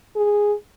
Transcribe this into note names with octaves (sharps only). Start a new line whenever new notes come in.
G#4